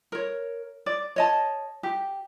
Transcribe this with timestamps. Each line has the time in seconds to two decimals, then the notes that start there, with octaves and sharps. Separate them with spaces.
0.12 A#4 C#5
0.86 D5
1.16 C#5 D#5 A5
1.83 G4